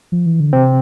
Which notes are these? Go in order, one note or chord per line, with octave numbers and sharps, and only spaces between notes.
F3
E3
D3
C3 C4